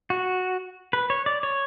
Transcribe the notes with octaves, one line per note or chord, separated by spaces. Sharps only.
F#4
B4
C#5
D5
C#5